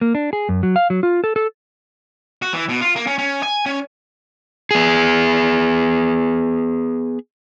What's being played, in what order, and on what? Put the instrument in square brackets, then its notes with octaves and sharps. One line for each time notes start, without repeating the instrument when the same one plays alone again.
[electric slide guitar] A#3
D4
G#4
F#2
F#3
F5
F#3
F4
A4
A4
[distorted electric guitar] F#4
E3
B2
F4
A#3
C#4
C#4
G#5
C#4
[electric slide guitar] B3 G#4